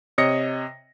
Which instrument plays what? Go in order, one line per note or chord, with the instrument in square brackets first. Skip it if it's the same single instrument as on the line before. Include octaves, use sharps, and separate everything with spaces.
[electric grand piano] C3 C#5 D#5 D#6 A#6 C#7